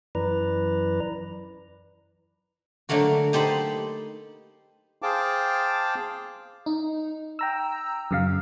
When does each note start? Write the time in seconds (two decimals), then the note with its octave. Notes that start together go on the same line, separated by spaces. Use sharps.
0.15 F#2 E3 B4 D5 A#5
2.89 D3 F#3 A3 A#3 F#4
3.33 D#4 G4 A4 C5 B5
5.02 G#4 C5 F5 G5 A5 D6
6.66 D#4
7.39 G5 A#5 E6
8.11 F#2 C#3 F5